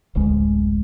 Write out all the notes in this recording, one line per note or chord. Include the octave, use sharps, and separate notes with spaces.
D1 A1 D2 G#3